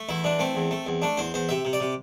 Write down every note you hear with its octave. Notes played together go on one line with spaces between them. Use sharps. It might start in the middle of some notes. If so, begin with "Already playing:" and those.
Already playing: A3
E2 E4
E3 D4
A3 C4
E2
A3
E2
A3 D4
E2 C5
E2 C5
C3 E5
C3
D5
C3